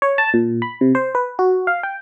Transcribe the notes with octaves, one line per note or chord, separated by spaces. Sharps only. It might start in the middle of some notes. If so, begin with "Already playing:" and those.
C#5
A5
A#2
B5
C3
C5
B4
F#4
F5
G5